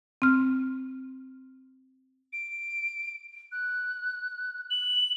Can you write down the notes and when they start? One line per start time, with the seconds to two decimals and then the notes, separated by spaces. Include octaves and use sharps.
0.22 C4 F6
2.33 D7
3.52 F#6
4.71 F#7